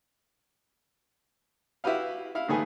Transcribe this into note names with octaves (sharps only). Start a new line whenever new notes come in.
E4 F#4 G4 B4 F5
E4 F5
G#2 D#3 A3 G#4 B4 G#5